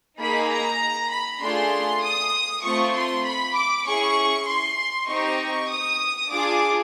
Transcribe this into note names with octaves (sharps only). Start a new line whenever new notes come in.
A#3 D#4 G#4 B5
A#5
B5
A3 D4 F4 G#4 C6
D#6
A3 C4 F4 C#6
C6
B5
D6
C#4 E4 G#4 C#6
C6
C4 D#4 G4 C#6
D#6
D4 F4 G#4 D6